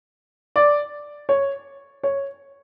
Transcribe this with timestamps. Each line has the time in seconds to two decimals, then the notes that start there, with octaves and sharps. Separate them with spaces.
0.56 D5
1.29 C#5
2.03 C#5